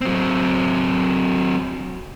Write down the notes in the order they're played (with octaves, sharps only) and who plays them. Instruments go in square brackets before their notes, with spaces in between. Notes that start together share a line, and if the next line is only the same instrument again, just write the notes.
[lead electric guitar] F#3 C4